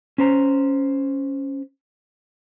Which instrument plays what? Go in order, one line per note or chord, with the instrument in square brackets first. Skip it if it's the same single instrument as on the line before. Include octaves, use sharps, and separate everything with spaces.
[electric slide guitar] C#4 C5 A#5